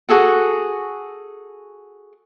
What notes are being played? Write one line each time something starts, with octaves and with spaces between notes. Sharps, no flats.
F#4 G#4 A4 F#5